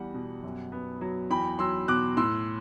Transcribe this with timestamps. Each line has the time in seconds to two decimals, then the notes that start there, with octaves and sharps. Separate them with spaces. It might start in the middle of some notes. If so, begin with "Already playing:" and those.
Already playing: E2 G3 F#5
0.14 B2
0.43 F#2
0.72 B3
1.01 F#3
1.30 E2 G5 B5
1.59 F#3 C6 E6
1.88 B2 D6 F#6
2.17 A2 C6 E6